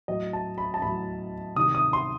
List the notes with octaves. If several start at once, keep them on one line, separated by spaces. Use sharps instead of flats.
A2 F#3 D#5
A5
B5
A5
A2 F#3 B5
C3 D#3 G3 D#6
D#6
C6